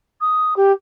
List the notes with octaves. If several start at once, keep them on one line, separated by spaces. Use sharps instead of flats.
D#6
G4